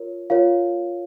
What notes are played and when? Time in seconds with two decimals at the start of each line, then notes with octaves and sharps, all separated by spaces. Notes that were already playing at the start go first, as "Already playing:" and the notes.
Already playing: F4 A#4 C#5
0.30 F4 A#4 C#5 F5